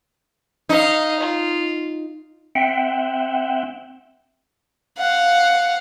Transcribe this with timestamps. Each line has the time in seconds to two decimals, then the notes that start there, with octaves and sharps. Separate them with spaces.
0.69 D#4 D#5 F5
1.20 F4
2.55 C4 E5 F#5 G5
4.98 F5 F#5